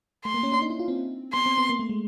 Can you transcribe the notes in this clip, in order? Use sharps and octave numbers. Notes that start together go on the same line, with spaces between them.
A3 C6
A#3
C#4
D4
D#4
E4
F4
C4
B3 C6
C4
B3
A#3
A3
G#3